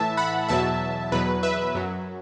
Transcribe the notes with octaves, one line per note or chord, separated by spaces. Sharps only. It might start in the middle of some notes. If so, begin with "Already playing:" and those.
Already playing: A2 E3 E5 A5
F#5 B5
E2 B2 F#3 E5 A5
E2 B2 F#3 B4
B4 E5
F#2 F#3